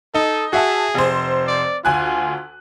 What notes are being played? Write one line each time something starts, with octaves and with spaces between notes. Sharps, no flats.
D#4 A4
F#4 G#4 E5 A5
F1 C5
D5
D2 F4 G#5 F#6